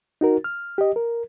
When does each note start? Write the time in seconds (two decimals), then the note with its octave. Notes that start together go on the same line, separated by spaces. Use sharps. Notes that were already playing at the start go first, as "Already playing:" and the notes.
0.21 D#4 F#4 A#4
0.44 F6
0.78 G4 D#5
0.96 A#4